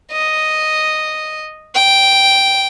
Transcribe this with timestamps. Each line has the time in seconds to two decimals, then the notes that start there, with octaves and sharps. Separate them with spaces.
0.11 D#5
1.75 G5